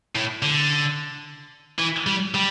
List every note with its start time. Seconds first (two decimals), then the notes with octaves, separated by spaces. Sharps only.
0.15 A2
0.42 D3
1.79 E3
2.07 G3
2.34 G3